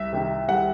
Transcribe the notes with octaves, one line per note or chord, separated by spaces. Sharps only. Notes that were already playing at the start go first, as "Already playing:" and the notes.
Already playing: C2 E5
C3 D#3
C2 F#5